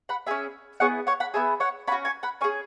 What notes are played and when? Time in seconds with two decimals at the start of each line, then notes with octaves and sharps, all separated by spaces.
0.09 F#5 B5
0.27 C#4 G#4 E5 G#5
0.80 B3 E4 G#4 C#5 F#5
1.07 C#5 F#5
1.20 F#5 B5
1.34 B3 E4 G#4 E5 G#5
1.60 C#5 F#5
1.87 C#4 F#5 B5
1.92 F#4
2.05 G#5 C#6
2.23 F#5 B5
2.41 C#4 G#4 G#5 C#6